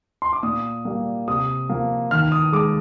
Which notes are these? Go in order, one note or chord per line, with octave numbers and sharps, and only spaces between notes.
C6
D6
A#2 D#6
G3 A#3
C3 D#6
F3 A#3
D#3 F6
D#6
G#3 D6